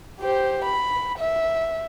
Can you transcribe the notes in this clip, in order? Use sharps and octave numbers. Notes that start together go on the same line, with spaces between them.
G4 C5
B5
E5